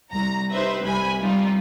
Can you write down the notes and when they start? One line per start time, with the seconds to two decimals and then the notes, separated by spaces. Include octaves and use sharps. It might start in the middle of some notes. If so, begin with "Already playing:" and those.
0.12 C2 A#5
0.53 D#4 G4 B4 C5 E5
0.84 C2 C3 G#5 B5
1.21 G3 D#4 F4